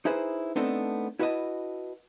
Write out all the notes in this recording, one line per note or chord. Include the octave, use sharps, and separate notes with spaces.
D#4 E4 G#4 B4 C5
A3 B3 C4 D4 D#4 A4
E4 F#4 B4 C#5 D#5 A5